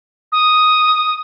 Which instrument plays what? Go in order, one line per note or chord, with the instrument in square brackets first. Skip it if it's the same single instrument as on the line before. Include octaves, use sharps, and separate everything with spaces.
[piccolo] D#6